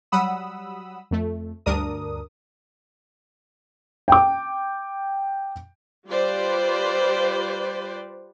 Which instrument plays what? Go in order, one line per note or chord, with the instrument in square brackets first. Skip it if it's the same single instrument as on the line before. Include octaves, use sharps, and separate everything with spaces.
[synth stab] F#3 G3 F#5 B5 D#6 E6
F2 A3
D2 G2 D4 A#4 D#6
[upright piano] G5 D6
[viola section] G3 F4 G4 B4 C5 D5